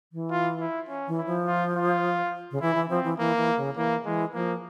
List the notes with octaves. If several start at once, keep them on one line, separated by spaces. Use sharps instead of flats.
E3
F4
E4
C#4
E3
E4
F3
F4
F4
C#3
E3 E4
E3
F3 C4
E3
E3 A#3
E3
C#3
E3 A#3
E3 G#3
F3 A#3